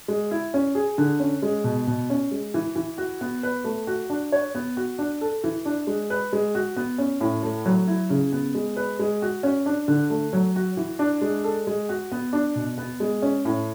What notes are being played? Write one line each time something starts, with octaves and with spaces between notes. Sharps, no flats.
G#3
E4
C#4
G#4
D3
C#4
G#3
B2
B2
C#4
G#3
E3
E3
F#4
B3
B4
A3
F#4
D4
C#5
B3
F#4
D4
A4
E3
D4
G#3
B4
G#3
F#4
B3
C#4
A2
A3
F#3
E4
C#3
B3
G#3
B4
G#3
F#4
C#4
D4
D3
A3
F#3
F#4
E3
D4
G#3
A4
G#3
F#4
B3
D4
B2
B3
G#3
C#4
A2